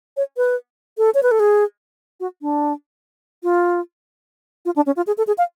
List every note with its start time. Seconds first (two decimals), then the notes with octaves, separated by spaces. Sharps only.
0.17 C#5
0.37 B4
0.98 A4
1.14 C#5
1.23 B4
1.31 A4
1.40 G#4
2.20 F#4
2.42 D4
3.43 F4
4.65 F4
4.76 D4
4.86 C#4
4.97 F4
5.07 G#4
5.18 A4
5.27 G#4
5.38 F5